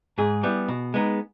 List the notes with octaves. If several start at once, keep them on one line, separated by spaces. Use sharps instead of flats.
G#2 G#4
G3 B3 E4
B2
G#3 B3 D#4